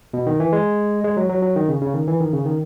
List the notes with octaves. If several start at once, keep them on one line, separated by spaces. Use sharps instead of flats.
B2
D#3
E3
G#3
G#3
F#3
F#3
F#3
D#3
C#3
C#3
D#3
E3
D#3
C#3
D#3